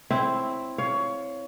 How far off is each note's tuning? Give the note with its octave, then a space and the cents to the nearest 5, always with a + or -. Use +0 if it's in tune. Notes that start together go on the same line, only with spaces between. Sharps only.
C4 +0 E4 +0 C#5 +0
C#5 +20 F5 +0